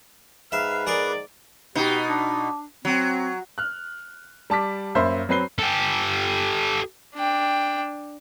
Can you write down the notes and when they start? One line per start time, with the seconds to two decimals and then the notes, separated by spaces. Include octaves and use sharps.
0.52 G#2 B4 E5 F5
0.87 G#4 A#4 D5
1.75 B2 D#4 G4
2.09 D4
2.85 F#3 C4
3.58 F6 F#6
4.50 G3 A5 D6 B6
4.95 F#2 A#3 C5 E5 B5
5.29 F#3 C4 B4 C7 G7
5.59 G4 A4
7.15 D4 G5